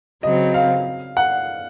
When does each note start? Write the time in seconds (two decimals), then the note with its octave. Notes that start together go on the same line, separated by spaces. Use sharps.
0.23 C#3 F#3 C4 D#5
0.54 F5
1.17 F#5